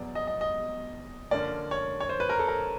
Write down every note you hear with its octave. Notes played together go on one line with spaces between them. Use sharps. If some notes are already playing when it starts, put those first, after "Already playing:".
Already playing: E2 B2 F#3 B3 D5
D#5
D#5
D#5
D3 F3 A#3 C#4 D5
C#5
C#5
C5
B4
A#4
A4
A#4